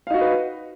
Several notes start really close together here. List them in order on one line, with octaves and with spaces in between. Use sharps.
F5 D#4 F#4 D#5 B4